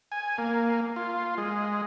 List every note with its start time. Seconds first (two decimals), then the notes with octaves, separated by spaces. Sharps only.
0.12 G#5
0.38 A#3
0.96 F4
1.38 G#3